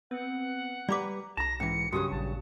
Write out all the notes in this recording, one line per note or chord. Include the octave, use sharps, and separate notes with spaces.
B3 C4 B4 F#5
G3 G4 B4 D5 A#5 D6
B1 A5 A#5 A#6
G#2 E3 C#4 C#7
G2 C#3 F#3 F#4 G4 D#6
A1 A#2 A5